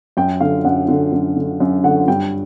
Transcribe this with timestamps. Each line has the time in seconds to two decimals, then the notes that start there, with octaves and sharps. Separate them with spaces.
0.17 F#2 G5
0.40 D3 F5
0.65 F#2 F#5
0.89 D3
1.12 F#2
1.37 D3
1.60 F#2
1.84 D3 F#5
2.08 G2 G5